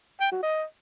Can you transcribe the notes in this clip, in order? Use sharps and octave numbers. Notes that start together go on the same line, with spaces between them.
G5
F#4
D#5